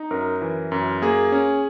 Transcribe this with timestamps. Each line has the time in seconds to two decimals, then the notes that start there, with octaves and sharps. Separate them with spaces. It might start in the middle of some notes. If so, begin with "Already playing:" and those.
Already playing: D#4
0.11 F#2 A#4
0.41 E3
0.72 F#2
1.02 A#3 G#4
1.32 C#4